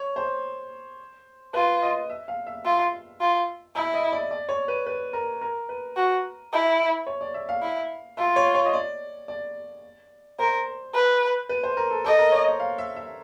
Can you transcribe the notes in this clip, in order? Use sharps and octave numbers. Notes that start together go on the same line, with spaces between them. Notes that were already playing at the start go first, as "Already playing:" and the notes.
Already playing: C#5
C5
F4 B4
D#5
E5
F5
E5
F4 E5
F4
E4 E5
D#5
D5
D5
C#5
B4
B4
A#4
A#4
B4
F#4
E4
C#5
D5
E5
F5
E4
F4 E5
C#5
C#5
D#5
D5
D5
A#4 C5
B4
B4
C5
A#4
A4
A4 D#5
A#4
C#5
C5
F5
E5
E5